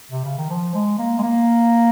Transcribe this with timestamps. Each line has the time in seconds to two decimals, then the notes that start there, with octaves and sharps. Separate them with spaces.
0.12 C3
0.25 C#3
0.38 D#3
0.50 F3
0.74 G#3
0.99 A#3
1.18 G#3
1.22 A#3